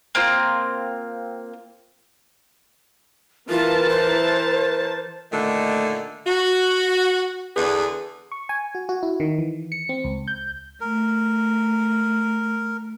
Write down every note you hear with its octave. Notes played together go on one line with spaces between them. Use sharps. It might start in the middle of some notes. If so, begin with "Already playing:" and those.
A#3 C4 F4
E3 F4 A#4 A5
C5
A#2 D3 D#3 A3
F#4
E2 D3 G#4 B4
C#6
G#5
F#4
F#4
E4
D#3
E3
C#7
C4
C#2
G6
A3 A#4